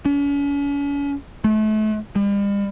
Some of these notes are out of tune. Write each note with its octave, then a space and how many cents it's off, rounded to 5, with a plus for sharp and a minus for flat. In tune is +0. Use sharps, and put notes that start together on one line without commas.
C#4 +40
A3 -35
G3 +45